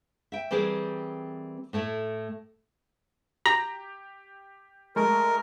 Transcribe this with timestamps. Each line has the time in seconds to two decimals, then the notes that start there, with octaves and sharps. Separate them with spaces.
0.32 E5 G5
0.51 E3 G3 C4 G4 G#4 A#4
1.73 A2 A3 E4 A4
3.46 G4 A#5
4.96 G#3 A3 A#4